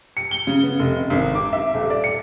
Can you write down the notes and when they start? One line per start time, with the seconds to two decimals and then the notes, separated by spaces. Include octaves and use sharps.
0.17 C#7
0.31 G7
0.47 C#3
0.63 B3
0.79 F1
1.10 G#1
1.35 D6
1.53 E5
1.74 D#1
1.90 D5
2.04 C#7